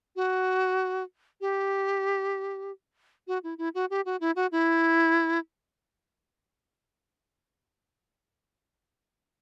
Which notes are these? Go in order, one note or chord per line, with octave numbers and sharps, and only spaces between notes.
F#4
G4
F#4
E4
E4
F#4
G4
F#4
E4
F#4
E4